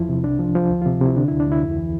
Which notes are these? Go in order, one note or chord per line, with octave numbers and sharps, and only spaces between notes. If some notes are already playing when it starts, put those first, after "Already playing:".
Already playing: E2 F3 E4
C3
C2 D4
F3
F3
D2
C3 F4
C3 E4
D3 D4
D2 E4
D4
D2 E4
F2
E3